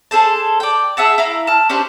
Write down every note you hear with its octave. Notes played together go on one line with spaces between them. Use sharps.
G#4 A4 C5 A5
D5 G5
G#4 E5 F#5 A5
E4 F5 A#5
A5 F6
C#4 D4 G4 C5